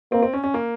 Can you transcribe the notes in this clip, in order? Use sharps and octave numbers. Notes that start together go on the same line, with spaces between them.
A#3 C4
C4
C#4
C#4
A#3